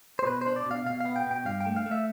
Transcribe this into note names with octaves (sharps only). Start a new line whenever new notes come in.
C5
B2 B4
C5
D4
D5
B2 F5
B2 F5
B3 F5
G5
B2 G5
G2 F5
G5
A3
F5
A3
E5